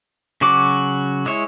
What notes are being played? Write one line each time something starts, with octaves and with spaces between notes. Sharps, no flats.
C#3 F#3 F#4 D6
G#3 E4 C#5